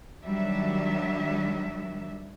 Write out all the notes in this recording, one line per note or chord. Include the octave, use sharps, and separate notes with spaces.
D#3 F#3 G3 D4 E5